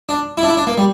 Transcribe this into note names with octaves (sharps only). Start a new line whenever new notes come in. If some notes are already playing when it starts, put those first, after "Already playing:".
D4
E4
D4
E4
D4
A#3
G3